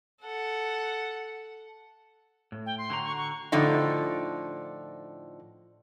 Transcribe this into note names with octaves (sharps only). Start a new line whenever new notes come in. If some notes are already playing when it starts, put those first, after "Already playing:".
A4 F#5
A2
G5
C6
D3 F#4 A#5
C#6
C#6
A2 D3 F3 D#4